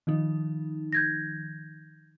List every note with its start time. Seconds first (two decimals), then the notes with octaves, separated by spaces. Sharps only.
0.07 D#3 F3 D#4
0.93 G6 G#6 A#6